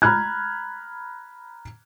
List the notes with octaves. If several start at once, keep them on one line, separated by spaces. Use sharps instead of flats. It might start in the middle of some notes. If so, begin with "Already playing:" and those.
A#5 B5 F6 F#6 G#6